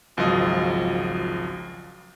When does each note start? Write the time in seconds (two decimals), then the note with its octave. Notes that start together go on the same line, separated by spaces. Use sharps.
0.17 G#1 C#2 F3 F#3 F4 D#5